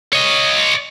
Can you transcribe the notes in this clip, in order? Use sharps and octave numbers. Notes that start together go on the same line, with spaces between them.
C#5 D#5